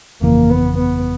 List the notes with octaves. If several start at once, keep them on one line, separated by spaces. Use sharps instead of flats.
G1 F2 C#3 E3 A#3
B3
B3